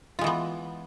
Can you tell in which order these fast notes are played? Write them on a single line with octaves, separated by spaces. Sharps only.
F4 G#3 E3 B3